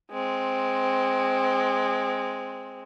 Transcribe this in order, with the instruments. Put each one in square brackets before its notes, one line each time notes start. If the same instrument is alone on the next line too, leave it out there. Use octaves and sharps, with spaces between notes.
[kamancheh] G#3 C4